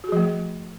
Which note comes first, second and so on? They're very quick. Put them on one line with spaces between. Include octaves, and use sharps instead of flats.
F#4 G#4 F3 A3